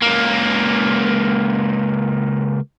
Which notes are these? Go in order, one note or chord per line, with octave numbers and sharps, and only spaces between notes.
C#2 A#3